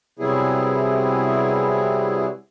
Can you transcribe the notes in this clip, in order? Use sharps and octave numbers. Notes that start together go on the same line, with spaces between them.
C3 F#3 G3 B3 E4 G#4